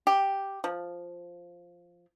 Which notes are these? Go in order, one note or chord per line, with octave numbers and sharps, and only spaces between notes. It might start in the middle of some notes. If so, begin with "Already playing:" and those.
G4
F3